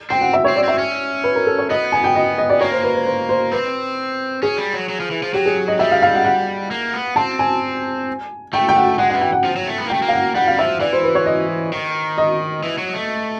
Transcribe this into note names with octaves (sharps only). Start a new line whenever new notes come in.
C4 G5
F#5
E5
C4 C#5
D5
C4 E5
C#4
B4
A#4
A4
C#5
B3 D#5
G#5
G5
D#5
D#5
D5
A#3 C#5
C5
B4
C5
C5
C5
C4 B4
C#4 G#4
G3
F#3
F#3
F3
E3
F3
F#3 G4
G#4
D#5
G3 E5
F5
F5
F#5
F#5
A#3
B3
C4 A5
G#5
A3 G5
G5
F#5
G#3 F#5
E3 F#5
G5
F#5
F3
F#3
A3
B3
A#3
A3 G5
A#3
F5
F#5
G3 F#5
F5
F3 E5
E3 D5
C5
B4
C#5
D#5
D#3
D#5
E3
F#3
A3